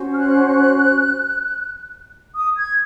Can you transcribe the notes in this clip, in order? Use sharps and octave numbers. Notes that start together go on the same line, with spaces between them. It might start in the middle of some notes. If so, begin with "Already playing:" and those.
Already playing: C#4 F#4 C5
F6
F#6
D#6
G#6